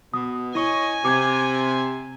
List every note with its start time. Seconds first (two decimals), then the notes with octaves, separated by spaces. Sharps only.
0.14 B2 D#6
0.55 E4 C#5 D#5 G#5 C#6
1.05 C3 D6 G#6